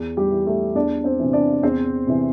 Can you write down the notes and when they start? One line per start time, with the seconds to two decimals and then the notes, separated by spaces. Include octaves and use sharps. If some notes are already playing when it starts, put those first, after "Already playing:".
Already playing: E2
0.17 G3 G4
0.31 E3
0.46 A3 A4
0.75 E2 D4 D5
1.04 C4 C5
1.19 C3 E3
1.33 D4 D5
1.62 E2 C4 C5
2.07 C3 E3